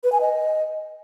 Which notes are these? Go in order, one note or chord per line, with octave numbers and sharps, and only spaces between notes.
B4
G#5
D#5